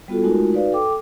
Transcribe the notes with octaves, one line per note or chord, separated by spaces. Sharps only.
G3 B3 F4 F#4 A4
G#3 A3 D#4 F4 F#4 A#4
D#4 F#4 B4 D5 F5
A4 G5 D6